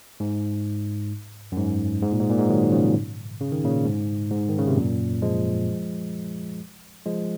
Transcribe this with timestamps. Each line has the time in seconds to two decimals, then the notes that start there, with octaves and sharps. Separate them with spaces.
0.20 G#2
1.52 F#2
1.57 G#2
2.02 G#2
2.12 A#2
2.21 G#2
2.30 A#2
2.39 G#2
2.49 D#3 F#3
2.72 C#3 F3
3.41 C#3
3.52 D#3
3.64 A#2 C#3
3.85 G#2
4.32 G#2
4.49 D#3
4.58 C#3
4.67 C3
4.77 F#2 A#2
5.22 F3 G#3
7.06 F3 G#3